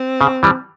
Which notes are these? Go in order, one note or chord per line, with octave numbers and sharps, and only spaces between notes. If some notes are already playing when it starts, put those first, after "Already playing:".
Already playing: C4
C#3
E3 G3